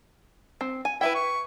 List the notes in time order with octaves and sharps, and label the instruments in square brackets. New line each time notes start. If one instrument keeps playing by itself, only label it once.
[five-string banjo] C4
G#5
[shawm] E4 [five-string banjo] B4 E5 G5
[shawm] C#6